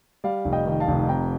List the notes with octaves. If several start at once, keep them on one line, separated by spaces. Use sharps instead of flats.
G3 D5 F5
F1
D#5 G5
D#3
F5 A5
F1
C3 G5 A#5